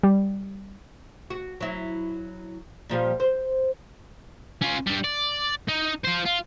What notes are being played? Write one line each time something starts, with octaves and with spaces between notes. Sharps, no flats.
G3
F#4
F#3 E4
A#2 F3 G3
C5
C#4 F4
G3 D4
D5
D#4
F4 C5
F4